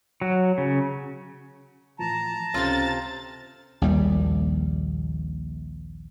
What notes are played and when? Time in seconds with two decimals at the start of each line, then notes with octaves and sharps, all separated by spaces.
0.22 F#3
0.58 C#3
1.99 A2 E3 F3 A5 A#5
2.54 C#2 C3 C#4 F4 A4 A6
3.82 A#1 D#2 G3